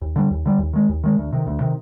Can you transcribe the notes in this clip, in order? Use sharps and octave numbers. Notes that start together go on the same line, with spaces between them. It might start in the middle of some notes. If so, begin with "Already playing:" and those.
D#2
D3 G3
D#2
D3 G3
D#2
D#3 G#3
D#2
D#3 G#3
D2
C3 D#3
D2
C3 D#3